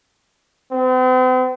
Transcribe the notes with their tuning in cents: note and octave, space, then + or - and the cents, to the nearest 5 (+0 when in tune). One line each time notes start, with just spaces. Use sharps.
C4 -45